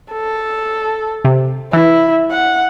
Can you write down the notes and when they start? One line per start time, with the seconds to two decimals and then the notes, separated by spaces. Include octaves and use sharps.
0.12 A4
1.25 C3
1.73 E3 E4
2.31 F#5